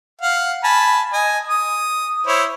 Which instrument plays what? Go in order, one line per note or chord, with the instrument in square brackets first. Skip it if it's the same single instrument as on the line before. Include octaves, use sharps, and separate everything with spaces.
[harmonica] F5 F#5
G#5 A5 B5
D#5 G#5
D#6
E4 C5 C#5